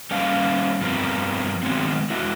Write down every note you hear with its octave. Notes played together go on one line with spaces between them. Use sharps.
G3 A#3 C#4 C5 F5 A5
G2 F3 B3 C4 A#4
D#3 F#3 G#3 B3 C4
G#3 E4 F#4